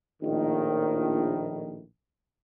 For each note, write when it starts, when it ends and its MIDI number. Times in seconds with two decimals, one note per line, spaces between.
0.23 1.83 34
0.23 1.83 45
0.23 1.83 51